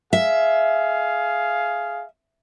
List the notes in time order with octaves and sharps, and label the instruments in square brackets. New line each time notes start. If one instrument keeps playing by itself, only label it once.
[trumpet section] G#4 F5 [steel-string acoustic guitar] E5